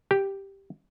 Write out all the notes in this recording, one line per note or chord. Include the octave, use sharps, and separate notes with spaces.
G4